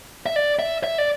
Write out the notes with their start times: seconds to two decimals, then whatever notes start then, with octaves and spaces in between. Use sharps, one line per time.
0.26 E5
0.36 D5
0.59 E5
0.84 E5
0.98 D5